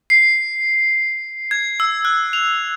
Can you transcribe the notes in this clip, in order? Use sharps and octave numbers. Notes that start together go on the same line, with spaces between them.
C7
G#6
E6
F#6
F7